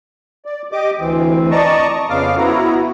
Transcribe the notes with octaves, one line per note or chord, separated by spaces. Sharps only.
D5
G4 D#5 D6
D2 E3 C4
D5 D#5 A5 A#5 C#6
F2 C#3 B3 F5 D6 F6
B3 E4 F#4 A#5